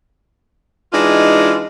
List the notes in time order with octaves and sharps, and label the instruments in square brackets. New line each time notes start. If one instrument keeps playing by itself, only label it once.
[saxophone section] E3 G#3 D4 D#4 F4